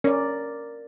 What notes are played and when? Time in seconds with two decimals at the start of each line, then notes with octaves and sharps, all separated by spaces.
0.04 C#4 A#4 D5